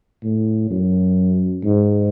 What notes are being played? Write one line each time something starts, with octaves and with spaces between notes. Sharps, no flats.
A2
F#2
G#2